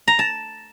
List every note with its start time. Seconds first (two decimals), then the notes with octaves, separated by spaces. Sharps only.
0.08 A#5
0.19 A5